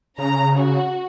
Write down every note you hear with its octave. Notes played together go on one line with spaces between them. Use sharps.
C#3 A#5
F#4